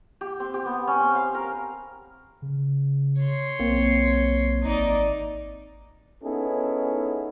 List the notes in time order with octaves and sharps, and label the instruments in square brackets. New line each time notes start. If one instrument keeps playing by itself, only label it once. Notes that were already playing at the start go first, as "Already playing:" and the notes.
[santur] G4
C4
G4
B3
C#4
C4
F5
A#4
[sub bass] C#3
[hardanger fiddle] C#5 C6
[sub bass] B1 [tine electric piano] A#3 C4
[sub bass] G#1 [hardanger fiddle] D#4 D5
[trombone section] B3 C#4 D#4 E4 G#4 A4